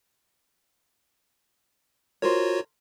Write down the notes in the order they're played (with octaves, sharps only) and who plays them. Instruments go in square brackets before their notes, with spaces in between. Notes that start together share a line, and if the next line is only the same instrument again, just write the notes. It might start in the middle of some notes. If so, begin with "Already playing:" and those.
[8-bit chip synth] F4 F#4 C#5 [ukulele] A#4 C5